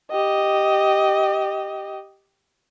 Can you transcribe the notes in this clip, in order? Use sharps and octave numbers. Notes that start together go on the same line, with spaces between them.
G4 D#5